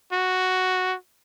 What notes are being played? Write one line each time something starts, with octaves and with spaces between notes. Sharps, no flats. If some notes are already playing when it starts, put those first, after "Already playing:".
F#4